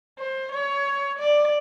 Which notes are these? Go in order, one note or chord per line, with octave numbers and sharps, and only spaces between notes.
C5
C#5
D5